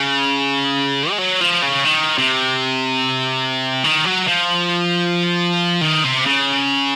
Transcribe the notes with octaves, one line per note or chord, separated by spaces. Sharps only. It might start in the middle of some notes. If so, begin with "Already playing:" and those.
Already playing: C#3
G#3
F#3
F3
C#3
D#3
C3
D#3
F#3
F3
D#3
C3
C#3